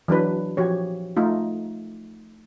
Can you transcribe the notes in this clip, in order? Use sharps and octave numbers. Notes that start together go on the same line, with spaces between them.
E3 F#3 D4 B4
F3 F#4 G4 C#5
A3 D#4 F4